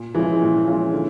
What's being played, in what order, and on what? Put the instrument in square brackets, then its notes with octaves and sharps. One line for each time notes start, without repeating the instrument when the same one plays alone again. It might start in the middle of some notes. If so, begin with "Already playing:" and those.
Already playing: [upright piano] A#2
[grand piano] E3 [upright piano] F3 G#3 C#4 F4
[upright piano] A#2
F3 G#3 C#4 F4
D3